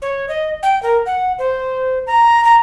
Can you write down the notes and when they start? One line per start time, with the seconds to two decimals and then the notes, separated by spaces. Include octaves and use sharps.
0.02 C#5
0.28 D#5
0.63 G5
0.83 A#4
1.06 F#5
1.38 C5
2.07 A#5
2.45 A#5